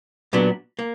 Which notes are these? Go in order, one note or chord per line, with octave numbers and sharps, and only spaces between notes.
A#2 F#3 B3 D4
A#3